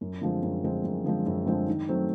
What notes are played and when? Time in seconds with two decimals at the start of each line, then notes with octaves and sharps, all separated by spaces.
0.01 F#2
0.21 D3 F3 G#3 C4
0.42 F#2
0.64 D3 F3 G#3 C4
0.84 F#2
1.04 D3 F3 G#3 C4
1.26 F#2
1.46 D3 F3 G#3 C4
1.68 D#3
1.89 F#3 A3 C4